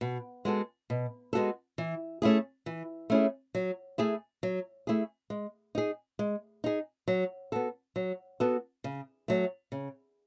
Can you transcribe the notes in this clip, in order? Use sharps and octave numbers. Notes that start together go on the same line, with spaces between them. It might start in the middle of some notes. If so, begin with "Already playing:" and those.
B2
G#3 B3 F#4 A4
B2
G#3 B3 F#4 A4
E3
A3 C#4 E4 G#4
E3
A3 C#4 E4 G#4
F#3
A3 E4 G#4
F#3
A3 E4 G#4
G#3
D#4 G#4
G#3
D#4 G#4
F#3
B3 F#4 A4
F#3
B3 F#4 A4
C#3
F#3 A3
C#3